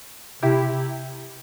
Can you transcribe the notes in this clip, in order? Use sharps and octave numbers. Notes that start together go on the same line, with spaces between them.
C3 E4 G4